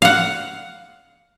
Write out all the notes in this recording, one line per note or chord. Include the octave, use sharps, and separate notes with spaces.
F5 F#5